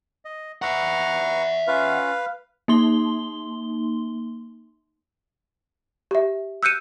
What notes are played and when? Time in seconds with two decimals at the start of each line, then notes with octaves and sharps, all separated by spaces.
0.25 D#5
0.62 B4 E5 F#5 A#5 C#6
1.67 C#4 F4 B4 F5
2.68 A#3 D#4 C6 G7
6.11 G4 E5
6.63 E6 F#6 G6 C#7 D#7 E7